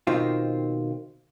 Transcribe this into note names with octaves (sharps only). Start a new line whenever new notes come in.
B2 D#3 C4 F4